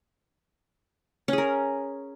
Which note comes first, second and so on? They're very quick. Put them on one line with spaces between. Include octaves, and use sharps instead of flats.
C#4 G#4 A#4